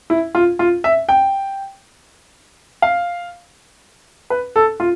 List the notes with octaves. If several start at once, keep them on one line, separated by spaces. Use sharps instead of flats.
E4
F4
F4
E5
G5
F5
B4
A4
F4